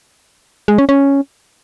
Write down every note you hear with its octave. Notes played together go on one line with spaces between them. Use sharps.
G#3
C#4
C#4